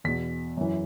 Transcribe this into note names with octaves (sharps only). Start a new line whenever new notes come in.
E2 B2 B6
F#2 E3